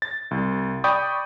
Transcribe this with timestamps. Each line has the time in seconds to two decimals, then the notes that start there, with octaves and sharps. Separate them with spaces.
0.02 A6
0.31 C2
0.84 D5 G5 B5 C#6 D#6 G6